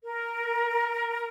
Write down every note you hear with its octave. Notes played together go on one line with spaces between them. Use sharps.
A#4